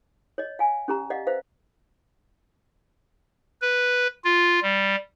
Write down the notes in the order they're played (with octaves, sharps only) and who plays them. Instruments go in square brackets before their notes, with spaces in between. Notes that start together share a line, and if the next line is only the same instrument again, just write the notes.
[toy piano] C#5 D#5
F5 G#5
C#4 G4 A#5
D5 D#5 F5 F#5
B4 C5 E5 F5
[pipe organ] B4
F4
G3